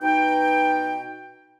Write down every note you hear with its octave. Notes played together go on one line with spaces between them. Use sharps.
B2 D#4 G5